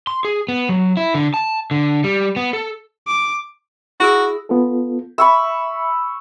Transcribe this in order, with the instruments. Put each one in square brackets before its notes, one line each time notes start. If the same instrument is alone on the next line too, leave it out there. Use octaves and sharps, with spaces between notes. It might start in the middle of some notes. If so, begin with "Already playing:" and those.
[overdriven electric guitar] C6
G#4
B3
F#3
E4
D3
A5
D3
G3
B3
A4
[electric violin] D6
[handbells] E4 G#4 E6 [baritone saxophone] F#4
[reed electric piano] B3 F4 A4
[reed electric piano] E5 [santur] B5 C#6 E6